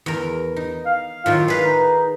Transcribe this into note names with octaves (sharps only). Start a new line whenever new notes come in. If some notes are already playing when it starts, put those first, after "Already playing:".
E2 A#4
D#4
F5
A2 D#3 F#3 F4
G#4 B4 F5
D#4